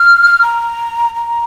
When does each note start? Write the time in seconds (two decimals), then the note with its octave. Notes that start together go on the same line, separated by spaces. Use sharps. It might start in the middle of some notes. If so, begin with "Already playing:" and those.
Already playing: F6
0.42 A#5
1.15 A#5